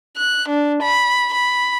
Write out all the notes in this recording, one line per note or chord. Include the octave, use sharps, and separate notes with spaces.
F#6
D4
B5
B5